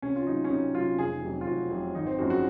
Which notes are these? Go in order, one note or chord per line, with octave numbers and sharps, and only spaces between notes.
C2 C#4
F4
C3 F#3 D#4
C#4
C2 D#4
C3 F#3 F4
F1 G#4
F2 C3 F#3
F4
F1 F#4
F2 C3 F#3
G#1 D#4
C4
F#2 F3 G#3 F#4
F#4